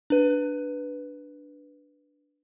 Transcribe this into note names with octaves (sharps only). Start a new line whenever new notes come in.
D4 B4